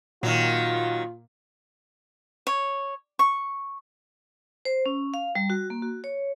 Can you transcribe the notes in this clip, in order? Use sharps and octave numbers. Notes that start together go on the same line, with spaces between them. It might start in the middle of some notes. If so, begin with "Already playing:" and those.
A#2 D#3 F#3 F4
C#5
C#6
C5
C#4
F5
G3
F#4
A#3
F#4
C#5